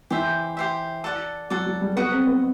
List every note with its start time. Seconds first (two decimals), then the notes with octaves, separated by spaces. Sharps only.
0.10 E3 G4 C5 E5
0.57 G4 C5 E5
1.04 A4 D5 F#5
1.50 F#3 A4 D5 F#5
1.66 F#3
1.81 G3
1.96 B3 F#4 B4 D#5 F#5
2.12 C4
2.27 B3